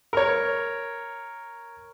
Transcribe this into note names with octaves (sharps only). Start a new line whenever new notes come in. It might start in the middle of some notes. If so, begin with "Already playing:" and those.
A#4 C#5